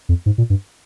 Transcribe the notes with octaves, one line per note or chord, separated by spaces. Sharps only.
F2
G#2
A#2
G2